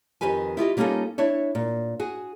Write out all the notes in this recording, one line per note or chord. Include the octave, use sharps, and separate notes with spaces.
F2 D#3 G4 B4 G#5
E4 F4 G4 D#5
G3 A#3 C#4 D#4 F4 A4
D4 E4 C#5
A#2
F#4 G#4